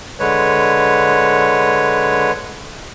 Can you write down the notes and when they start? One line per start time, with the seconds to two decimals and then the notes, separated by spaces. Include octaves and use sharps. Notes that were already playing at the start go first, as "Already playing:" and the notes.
0.19 D3 G#3 B4 C#5